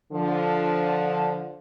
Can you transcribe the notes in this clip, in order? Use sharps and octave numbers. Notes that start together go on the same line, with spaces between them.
D3 F3